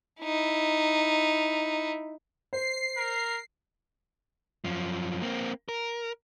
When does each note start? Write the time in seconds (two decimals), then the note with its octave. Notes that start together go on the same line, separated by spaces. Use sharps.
0.21 D#4 E4
2.53 C5 C7
2.97 A#4
4.64 F#2 F3
5.22 A#3 C4
5.69 A#4